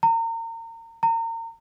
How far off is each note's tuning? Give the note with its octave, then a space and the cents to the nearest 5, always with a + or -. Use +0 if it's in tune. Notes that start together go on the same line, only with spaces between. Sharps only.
A#5 -35
A#5 -35